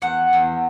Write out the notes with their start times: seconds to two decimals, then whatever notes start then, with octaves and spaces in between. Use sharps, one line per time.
0.02 E2 F#5
0.33 E2